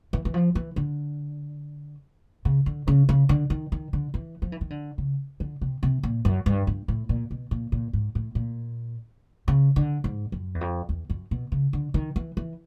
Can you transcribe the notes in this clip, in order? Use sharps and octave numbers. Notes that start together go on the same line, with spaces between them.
E3
E3
F3
E3
D3
C#3
D3
C#3
C#3
D3
D#3
D#3
D3
E3
F3
E3
D#3
D3
C#3
D3
C3
C3
A#2
F#2
G2
G2
A2
A#2
B2
A#2
A#2
G#2
A2
A#2
C#3
D3
G#2
F#2
E2
F2
E2
F#2
B2
C#3
D3
D#3
E3
E3